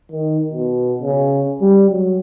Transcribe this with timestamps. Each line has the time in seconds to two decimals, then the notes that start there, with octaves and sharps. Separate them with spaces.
0.12 D#3
0.53 B2
1.02 C#3
1.61 G3
1.90 F#3